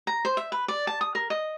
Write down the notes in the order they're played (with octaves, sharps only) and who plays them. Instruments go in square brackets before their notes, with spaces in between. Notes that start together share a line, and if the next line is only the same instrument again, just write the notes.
[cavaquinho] A#5
C5
E5
B4
D5
A5
D#6
A#4
D#5